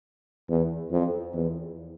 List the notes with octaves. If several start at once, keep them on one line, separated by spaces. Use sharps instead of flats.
E2
F2
E2